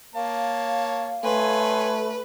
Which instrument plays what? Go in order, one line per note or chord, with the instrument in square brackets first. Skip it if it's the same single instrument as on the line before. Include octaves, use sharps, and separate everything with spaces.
[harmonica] A#3 C#5 A5 [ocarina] F5
[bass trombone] A3 [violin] B4 [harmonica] C#5 G#5 C6